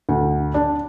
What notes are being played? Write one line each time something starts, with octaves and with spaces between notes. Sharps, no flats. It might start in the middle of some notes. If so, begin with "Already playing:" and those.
D2
D4